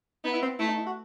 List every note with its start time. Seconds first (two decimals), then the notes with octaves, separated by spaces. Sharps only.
0.24 B3 D#4
0.33 E4
0.42 C4
0.59 A3 E4
0.68 D#4
0.77 E4
0.86 F#4